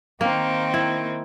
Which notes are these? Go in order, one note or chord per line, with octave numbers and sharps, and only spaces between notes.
D#3 A#3 C4
E4